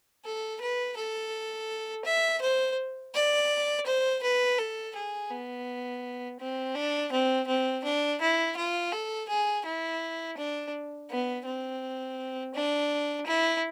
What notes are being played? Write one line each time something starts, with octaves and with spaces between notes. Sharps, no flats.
A4
B4
A4
E5
C5
D5
C5
B4
A4
G#4
B3
C4
D4
C4
C4
D4
E4
F4
A4
G#4
E4
D4
B3
C4
D4
E4